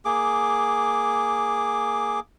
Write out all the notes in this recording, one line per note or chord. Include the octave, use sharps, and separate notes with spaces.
A#3 G#4 D6